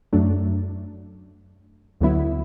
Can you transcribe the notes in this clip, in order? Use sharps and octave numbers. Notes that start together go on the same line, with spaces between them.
F#2 F#3 A3 D4
D2 D3 F#3 B3 E4